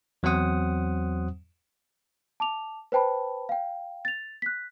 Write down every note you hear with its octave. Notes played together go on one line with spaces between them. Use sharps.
E2 F#3 C4 C5 F#5 D#6
A5 D6 F7
B4 C5 G5 A5 B5
F5 G5
A6 F7
F#6 B6